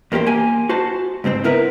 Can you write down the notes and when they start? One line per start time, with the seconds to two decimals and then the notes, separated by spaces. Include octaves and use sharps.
0.12 E2 A#3 F#4 G4 C5
0.27 A#3 G#5
0.69 F#4 C5 A5
1.24 C#2 G#2 C4 C5
1.44 B3 E4 A#4 B4 A#5